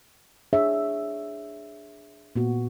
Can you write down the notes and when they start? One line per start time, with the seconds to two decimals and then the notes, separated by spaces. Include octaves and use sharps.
0.53 D4 G#4 C#5 E5
2.36 A#2 B3 F#4